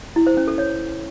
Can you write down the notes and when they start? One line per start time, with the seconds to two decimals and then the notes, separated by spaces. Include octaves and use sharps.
0.16 E4
0.27 C5
0.37 C#4
0.48 A4
0.58 C#5